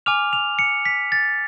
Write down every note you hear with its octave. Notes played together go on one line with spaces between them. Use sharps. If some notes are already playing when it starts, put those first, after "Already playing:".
G#5 D6 F6 F7
F7
C#7
B6
A6